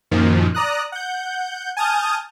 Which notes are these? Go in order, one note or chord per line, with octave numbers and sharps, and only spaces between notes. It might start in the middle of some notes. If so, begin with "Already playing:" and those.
F#2 A#2 D#3 F3
D5 A#5 D#6 F#6
F#5 G6
G#5 A5 D#6 F6 G6